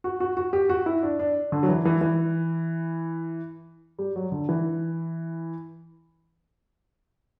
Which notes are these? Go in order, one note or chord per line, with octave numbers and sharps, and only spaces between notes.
F#4
F#4
F#4
G4
F#4
E4
D4
D4
D3
F#3
E3
E3
E3
G3
F#3
D3
E3